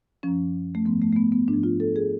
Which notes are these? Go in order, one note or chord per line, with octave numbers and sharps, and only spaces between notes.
F#2 F3 C#4
A3
G#2 F3 B3
A3
A3
B3
B3
G#2 D4
F3
F4
A4
G#4